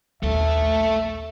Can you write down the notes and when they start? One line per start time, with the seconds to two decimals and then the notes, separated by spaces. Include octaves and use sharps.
0.23 A#1 D#2 A3 A4 E5